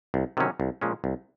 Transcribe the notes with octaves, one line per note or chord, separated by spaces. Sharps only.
C2
C3 D#3 F#3 C#4
C2
A#2 F3 G#3 C#4
C2